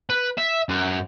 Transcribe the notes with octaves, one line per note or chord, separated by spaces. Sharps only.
B4
E5
F#2